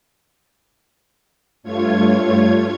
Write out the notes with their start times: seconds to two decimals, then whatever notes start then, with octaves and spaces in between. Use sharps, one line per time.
1.63 G2 A3 F4 C#5 G#6